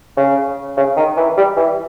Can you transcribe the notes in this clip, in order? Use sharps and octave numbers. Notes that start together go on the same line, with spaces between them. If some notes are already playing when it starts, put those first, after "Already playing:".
C#3
C#3
D#3
E3
G3
E3